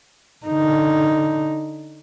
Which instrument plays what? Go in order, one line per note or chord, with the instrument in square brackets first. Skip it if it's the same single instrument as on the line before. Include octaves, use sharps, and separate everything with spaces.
[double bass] D3 D#4